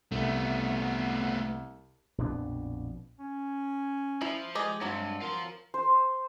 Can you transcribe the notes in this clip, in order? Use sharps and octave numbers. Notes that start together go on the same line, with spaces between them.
C2 A3 B3
A#1 F2 B2 D4
C#4
F3 E4
G#3 G4 G#4 D#5
G2 F#3 C4
F4 A#4 C5
C5